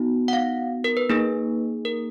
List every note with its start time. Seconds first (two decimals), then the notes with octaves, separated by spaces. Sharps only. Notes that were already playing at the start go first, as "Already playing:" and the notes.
Already playing: B3 D#4 F#4
0.28 F#5
0.33 F5
0.84 A#4
0.97 B4
1.09 A#3 D#4 G#4
1.85 A#4